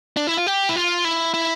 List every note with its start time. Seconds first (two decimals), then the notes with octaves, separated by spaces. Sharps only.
0.17 D4
0.27 E4
0.37 F4
0.47 G4
0.69 E4
0.76 F4
1.05 E4
1.34 E4